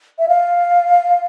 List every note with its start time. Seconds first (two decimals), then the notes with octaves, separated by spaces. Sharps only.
0.19 E5
0.28 F5